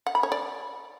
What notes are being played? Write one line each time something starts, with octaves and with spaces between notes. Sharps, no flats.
F#5
B5
C#5
D5